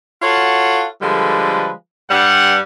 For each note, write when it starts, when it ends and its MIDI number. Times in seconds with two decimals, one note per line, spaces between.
0.22 0.86 65
0.22 0.86 66
0.22 0.86 69
0.22 0.86 73
0.22 0.86 78
0.22 0.86 81
1.01 1.70 50
1.01 1.70 53
1.01 1.70 55
1.01 1.70 56
1.01 1.70 69
1.01 1.70 71
2.10 2.58 43
2.10 2.58 55
2.10 2.58 78